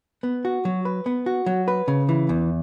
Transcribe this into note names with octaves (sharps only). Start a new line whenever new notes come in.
B3
F#4
F#3
B4
B3
F#4
F#3
B4
C#3
E3
E2